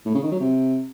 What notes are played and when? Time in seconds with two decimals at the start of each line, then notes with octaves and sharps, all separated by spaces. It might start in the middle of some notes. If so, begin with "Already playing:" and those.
0.06 A2
0.14 C#3
0.23 D#3
0.32 F#3
0.40 C3